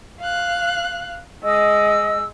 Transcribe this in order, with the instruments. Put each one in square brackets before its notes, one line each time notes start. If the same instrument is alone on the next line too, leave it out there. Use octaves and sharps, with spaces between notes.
[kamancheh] F5 F#6
[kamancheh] G#3 [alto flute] D#5 [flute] E6